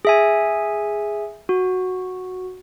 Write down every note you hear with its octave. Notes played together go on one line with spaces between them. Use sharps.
G#4 E5 G#5
F#4